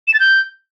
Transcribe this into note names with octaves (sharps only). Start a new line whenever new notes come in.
E7
A6
G6